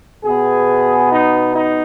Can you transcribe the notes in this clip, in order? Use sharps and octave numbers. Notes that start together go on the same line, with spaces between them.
B2 B3 G#4
D#4
D#4